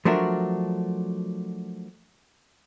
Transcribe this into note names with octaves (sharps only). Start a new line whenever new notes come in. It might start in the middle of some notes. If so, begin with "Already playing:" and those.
F3 F#3 A3 D4 F#4 A#4